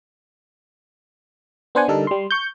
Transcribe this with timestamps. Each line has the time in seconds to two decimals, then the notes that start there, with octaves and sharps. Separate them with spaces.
1.75 B3 D4 C5 D5 F#5 G#5
1.88 D3 G3 D#4 A4 A#4
2.07 G3 C6
2.31 C#6 G6